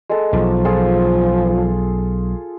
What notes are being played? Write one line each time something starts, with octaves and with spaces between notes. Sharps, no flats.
G#3 A4
B1 F3 A5
F4 G#4 A4